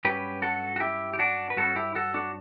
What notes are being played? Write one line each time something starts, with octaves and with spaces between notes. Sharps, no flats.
G2 F#3 C#4 G4 B4
F#4 A4
F#4
E4 G4
G4
D4 F#4
B4
G2 F#3 C#4 F#4 A4
E4 G4
F#4 A4
D4 F#4